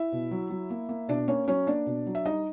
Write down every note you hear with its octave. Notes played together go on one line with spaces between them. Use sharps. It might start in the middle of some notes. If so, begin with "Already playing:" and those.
Already playing: E4 E5
B2
F#3
F#3
A#3
A#3
B2 D4 D5
A#3 C#4 C#5
F#3 C#4 C#5
A#3 D4 D5
B2
F#3
E5
G3 D#4 D#5